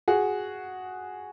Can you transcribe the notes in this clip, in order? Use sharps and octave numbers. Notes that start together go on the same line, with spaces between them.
F#4 G#4